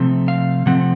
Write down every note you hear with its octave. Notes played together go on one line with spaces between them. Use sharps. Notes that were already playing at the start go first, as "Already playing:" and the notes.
Already playing: C3 F3 A3 C4
F5
C3 F3 A3 C4 F#5